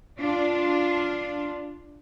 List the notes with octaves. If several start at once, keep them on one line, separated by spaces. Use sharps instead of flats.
D4 F4